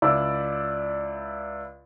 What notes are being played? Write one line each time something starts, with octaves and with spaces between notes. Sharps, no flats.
C#2 E4 D5 E6